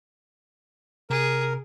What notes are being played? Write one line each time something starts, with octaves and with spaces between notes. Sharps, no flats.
C3 G#4 A#4